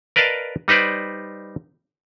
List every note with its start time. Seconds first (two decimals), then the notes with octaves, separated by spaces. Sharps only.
0.16 A#4 B4 D5 D#5 F5 A5
0.68 G3 D#4 B4 C5 D5